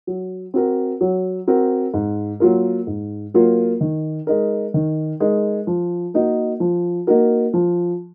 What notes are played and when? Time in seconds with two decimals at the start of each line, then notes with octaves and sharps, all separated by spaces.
0.07 F#3
0.54 C4 F#4 A#4
1.01 F#3
1.47 C4 F#4 A#4
1.94 G#2
2.40 F#3 A#3 F4 A#4
2.87 G#2
3.34 F#3 A#3 F4 A#4
3.81 D#3
4.27 G#3 D#4 A#4
4.74 D#3
5.20 G#3 D#4 A#4
5.67 F3
6.14 A#3 D#4 F#4 A#4
6.60 F3
7.07 A#3 D#4 F#4 A#4
7.54 F3